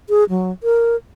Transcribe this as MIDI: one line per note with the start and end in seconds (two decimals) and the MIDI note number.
0.09 0.24 68
0.29 0.52 54
0.63 0.96 70